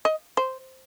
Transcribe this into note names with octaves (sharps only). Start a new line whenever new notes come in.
D#5
C5